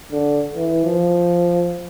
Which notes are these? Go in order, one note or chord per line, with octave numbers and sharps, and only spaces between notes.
D3
E3
F3